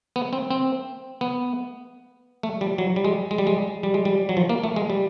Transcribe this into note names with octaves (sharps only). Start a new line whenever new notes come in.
B3
C4
C4
B3
A3
G3
F#3
G3
G#3
G#3
G3
G#3
G3
G#3
G3
F#3
F3
A#3
A3
G#3
G3